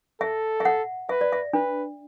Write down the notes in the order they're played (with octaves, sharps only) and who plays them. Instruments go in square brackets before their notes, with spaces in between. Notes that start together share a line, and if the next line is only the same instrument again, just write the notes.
[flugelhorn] A4 [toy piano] E5
[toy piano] E5
F#5
[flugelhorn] B4 [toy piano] E5
[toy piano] D5
E5
[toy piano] D4 [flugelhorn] B4